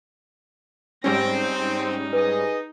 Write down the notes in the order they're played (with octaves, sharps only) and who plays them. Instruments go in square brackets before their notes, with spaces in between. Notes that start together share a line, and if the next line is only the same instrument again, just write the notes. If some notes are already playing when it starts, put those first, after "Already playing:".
[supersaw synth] G#2 G3 C#4 [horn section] C4 [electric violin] A#6 D7
[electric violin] D#4
[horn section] G#4 D#5 [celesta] B4